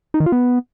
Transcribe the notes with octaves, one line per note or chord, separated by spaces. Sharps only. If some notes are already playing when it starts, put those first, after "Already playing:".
D#4
D#3
F4
B3